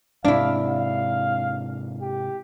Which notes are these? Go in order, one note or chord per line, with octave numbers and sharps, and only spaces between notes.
G#2 C3 D4 E4 F5
F5
G4